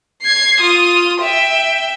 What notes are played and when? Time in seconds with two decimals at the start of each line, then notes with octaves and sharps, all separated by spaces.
0.22 G#6 C7
0.60 F4 D#6
1.21 E5 G5